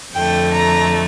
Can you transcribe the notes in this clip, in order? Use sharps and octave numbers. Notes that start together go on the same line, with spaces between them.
F2 D3 A3 G5
A#5